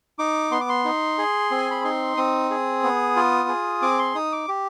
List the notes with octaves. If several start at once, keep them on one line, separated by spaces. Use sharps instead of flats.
D#4 D6
B3 C6
D6
C6
D#4
G#4
C4
G#5
B5
D#4 C6
C4 D#6
G#4
B3
F4
G#4
C4 D6
C6
D#4 D#6
D6
G4